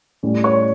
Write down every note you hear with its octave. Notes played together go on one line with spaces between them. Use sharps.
A2 G3 C#4
C#5 C#6